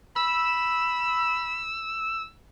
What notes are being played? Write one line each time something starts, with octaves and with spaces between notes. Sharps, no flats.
B5 E6